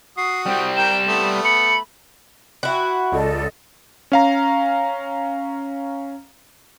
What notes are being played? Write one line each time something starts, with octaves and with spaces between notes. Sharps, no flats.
F#4 D#6 C7
G3 C4 G5
G4 A#4 G5 E7
A3 B3
B5 C#7
E4 F#4
C#2 A4 D5 D#5
C#4 F5 A#5